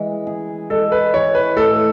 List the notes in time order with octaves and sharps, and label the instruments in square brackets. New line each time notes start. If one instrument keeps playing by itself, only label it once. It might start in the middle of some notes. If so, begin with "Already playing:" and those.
Already playing: [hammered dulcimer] E3 G#3
G#4
[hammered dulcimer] G#3 [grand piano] A4
[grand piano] B4
[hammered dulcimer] E3 [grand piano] C#5
[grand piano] B4
[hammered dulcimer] A2 [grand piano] A4